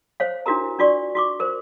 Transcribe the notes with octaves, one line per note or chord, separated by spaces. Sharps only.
C5 C#5 F5
D4 E4 F#4 G4 A#4 A#5
D4 F4 F#4 D5 C#6
F#4 C#6 D6
A#4 C5